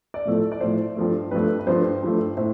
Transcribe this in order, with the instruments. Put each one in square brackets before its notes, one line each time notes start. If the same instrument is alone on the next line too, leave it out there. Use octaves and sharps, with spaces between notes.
[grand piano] D5
A2 F3 A3
D5
A2 F3 A3 C5
G2 F3 A3
G2 F3 A3 B4
B4
G2 F3 A3 C5
G2 F3 A3
A2 C5